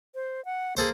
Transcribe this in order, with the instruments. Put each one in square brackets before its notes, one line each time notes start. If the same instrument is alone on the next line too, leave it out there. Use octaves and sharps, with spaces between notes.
[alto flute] C5
F#5
[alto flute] A#3 [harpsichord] G#4 A4 C5